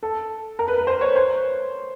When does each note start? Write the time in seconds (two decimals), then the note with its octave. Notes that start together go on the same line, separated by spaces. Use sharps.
0.03 A4
0.59 A#4
0.68 B4
0.78 B4
0.87 C5
1.01 C#5
1.16 C5